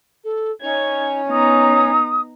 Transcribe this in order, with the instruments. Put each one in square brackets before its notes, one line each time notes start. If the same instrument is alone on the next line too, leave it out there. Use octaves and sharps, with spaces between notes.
[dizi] A4
[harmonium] C#4 C#5 [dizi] D#4 [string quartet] G#6
[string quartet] B3 D#4 A#5 [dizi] D#6